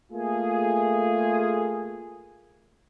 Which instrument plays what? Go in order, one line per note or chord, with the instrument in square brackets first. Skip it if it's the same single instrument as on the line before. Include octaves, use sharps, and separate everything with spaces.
[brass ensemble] A3 A#3 F4 G#4